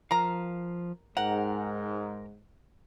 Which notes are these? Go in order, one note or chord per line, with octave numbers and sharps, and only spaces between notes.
F3 A#4 F5 A#5
G#2 A#4 F#5 G5 A#5